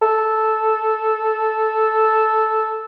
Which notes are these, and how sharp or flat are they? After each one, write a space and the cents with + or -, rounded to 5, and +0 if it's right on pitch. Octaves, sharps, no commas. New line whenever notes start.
A4 -5